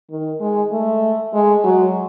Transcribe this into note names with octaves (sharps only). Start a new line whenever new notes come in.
D#3
G#3
A3
G#3
F#3